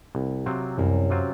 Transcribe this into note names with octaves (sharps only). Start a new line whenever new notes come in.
C2
C3 F#3 C4 F4
C2 F#2
C3 F#3 C4 F4